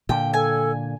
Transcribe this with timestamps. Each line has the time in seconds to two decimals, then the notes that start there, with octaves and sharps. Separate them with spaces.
0.09 A#2 D3 G5
0.34 A4 G#5